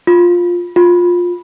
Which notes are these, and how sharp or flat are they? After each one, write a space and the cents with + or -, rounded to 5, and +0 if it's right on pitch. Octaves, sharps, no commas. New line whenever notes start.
F4 +10
F4 +15